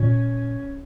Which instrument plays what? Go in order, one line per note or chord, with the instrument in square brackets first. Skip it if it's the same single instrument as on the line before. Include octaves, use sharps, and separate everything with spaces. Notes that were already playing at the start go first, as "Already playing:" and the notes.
Already playing: [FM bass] A#2 [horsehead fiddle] C#4